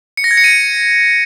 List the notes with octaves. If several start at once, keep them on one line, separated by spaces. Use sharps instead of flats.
C#7
A#6
G#6
C#7
D#7